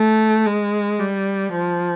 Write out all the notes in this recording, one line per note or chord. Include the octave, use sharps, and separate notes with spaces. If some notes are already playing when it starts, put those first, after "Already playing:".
Already playing: A3
G#3
G3
F3